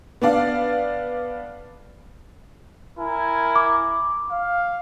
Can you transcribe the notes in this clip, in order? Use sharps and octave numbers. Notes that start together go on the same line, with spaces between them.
B3 D4 D5 F5
E4 A#4 G#5
D6
F5